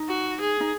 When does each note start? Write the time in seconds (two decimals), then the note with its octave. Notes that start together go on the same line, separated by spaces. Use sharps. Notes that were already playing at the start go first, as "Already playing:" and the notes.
Already playing: D#4
0.09 F#4
0.40 G#4
0.60 D#4